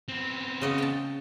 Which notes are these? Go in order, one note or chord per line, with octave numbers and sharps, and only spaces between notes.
B3 C4
C#3 D#5 F#5
G5 A5